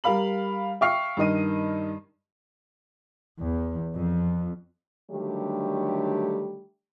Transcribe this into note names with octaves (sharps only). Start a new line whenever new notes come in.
G3 A#4 F5 B5 F#7
E5 F5 G5 C#6 F6 C7
G2 D#3 D#5 D#7
E2
F2
D3 D#3 F#3 G3 A3 G4